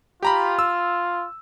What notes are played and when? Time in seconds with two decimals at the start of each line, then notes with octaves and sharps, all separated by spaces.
0.23 F4 G4 A#5 B5
0.59 E6